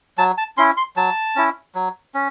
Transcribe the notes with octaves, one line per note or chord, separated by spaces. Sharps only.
F#3 A5
A5
C#4 E4 C6
C6
F#3 A5
C#4 E4
F#3
C#4